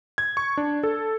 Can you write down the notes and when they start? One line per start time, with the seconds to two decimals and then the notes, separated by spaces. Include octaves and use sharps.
0.18 G#6
0.37 C#6
0.57 D4
0.83 A4